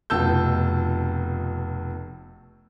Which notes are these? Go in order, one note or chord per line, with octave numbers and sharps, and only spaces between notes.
F1 B2 A5 E6 G6